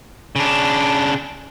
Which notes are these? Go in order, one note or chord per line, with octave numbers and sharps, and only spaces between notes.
C#3 D4